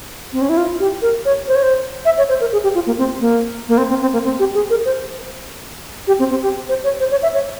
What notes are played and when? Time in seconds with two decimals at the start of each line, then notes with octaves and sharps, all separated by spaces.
0.33 C4
0.41 C#4
0.49 E4
0.57 F4
0.80 G4
1.02 A#4
1.25 C#5
1.48 C5
1.55 C#5
1.63 C5
2.05 E5
2.18 C#5
2.29 C5
2.41 A#4
2.52 G#4
2.63 G4
2.75 F4
2.86 A#3
2.98 C4
3.21 A#3
3.69 A#3
3.78 C4
3.89 C4
4.01 C4
4.13 A#3
4.24 C4
4.39 G4
4.54 G#4
4.70 A#4
4.85 C5
6.07 G4
6.19 C4
6.30 C4
6.43 G4
6.69 C5
6.84 C#5
7.00 C5
7.11 C#5
7.23 E5
7.34 C#5